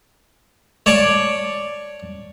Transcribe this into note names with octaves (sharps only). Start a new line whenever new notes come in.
C#5 D5 A5 C#6 D6